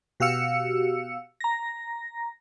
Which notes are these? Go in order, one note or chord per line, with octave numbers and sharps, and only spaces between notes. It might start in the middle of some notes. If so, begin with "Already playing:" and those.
B2 F#4 G4 F5 E6 C#7
A#5 A#6